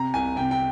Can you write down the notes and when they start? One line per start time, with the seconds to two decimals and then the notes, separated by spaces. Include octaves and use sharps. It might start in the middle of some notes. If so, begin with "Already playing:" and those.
Already playing: C3 A#5
0.14 C2 G#5
0.36 C3 G5
0.51 G5